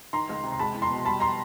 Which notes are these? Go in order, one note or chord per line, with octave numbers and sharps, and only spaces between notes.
D#3 A#5 C6
C#2
C3
C6
G#3 A5 B5
E2
A#5 C6
B2
G3 A5 B5
A#5 C6